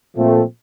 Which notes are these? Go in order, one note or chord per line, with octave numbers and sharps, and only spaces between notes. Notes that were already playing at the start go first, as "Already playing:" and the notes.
A#2 F3 A3 C4